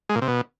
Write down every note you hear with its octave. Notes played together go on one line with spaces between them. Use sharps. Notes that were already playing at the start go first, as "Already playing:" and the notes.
G#3
A#2
C3
B2